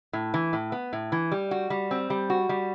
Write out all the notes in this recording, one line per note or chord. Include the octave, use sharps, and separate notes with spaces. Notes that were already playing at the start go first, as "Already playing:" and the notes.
A2
E3
A2
B3
A2
E3
G3
F#4
G3
C4
G3
F#4
G3